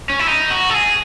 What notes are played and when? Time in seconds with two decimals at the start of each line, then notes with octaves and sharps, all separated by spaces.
0.10 C#4
0.19 E4
0.27 D#4
0.50 F#4
0.70 A4
0.74 G#4